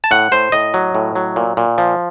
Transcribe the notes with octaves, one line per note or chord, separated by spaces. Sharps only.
A5
A2 F#5
A2 C5
A2 D#5
F#3
A2
F#3
A#2
A#2
F3